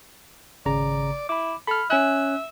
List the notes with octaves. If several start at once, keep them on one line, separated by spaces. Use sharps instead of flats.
G#1 C#3 D5 A#5
E4 B5 D6
A4 B5 F6
C#4 E5 G#5 F#6